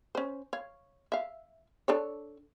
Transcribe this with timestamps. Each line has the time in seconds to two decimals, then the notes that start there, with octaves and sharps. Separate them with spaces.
0.15 C#4 C5
0.53 C#5 F5
1.12 E5 F5
1.88 D4 A4 C#5